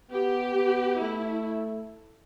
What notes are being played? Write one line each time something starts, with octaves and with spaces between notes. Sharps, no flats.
B3 G4
B3
A3 E4